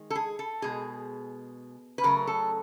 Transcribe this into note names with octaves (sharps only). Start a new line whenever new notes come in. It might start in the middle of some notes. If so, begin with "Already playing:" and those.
Already playing: D#3 G#3
A4
G#4
A4
B2 G#3 G#4
B4
C#3 F#3 A3 A#4
A4